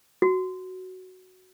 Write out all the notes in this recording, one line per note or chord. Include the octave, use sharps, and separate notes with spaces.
F#4